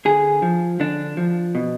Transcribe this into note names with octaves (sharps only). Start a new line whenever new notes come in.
D3 G#4
F3
D3 D4
F3
B2